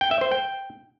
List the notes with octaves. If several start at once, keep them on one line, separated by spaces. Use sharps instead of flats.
G5
E5
C5
G5